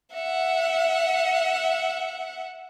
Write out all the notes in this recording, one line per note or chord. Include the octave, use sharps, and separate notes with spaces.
E5 F#5